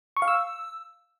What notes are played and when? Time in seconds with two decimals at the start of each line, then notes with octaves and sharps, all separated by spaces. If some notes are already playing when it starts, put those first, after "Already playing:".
0.17 C#6
0.22 F5
0.28 E6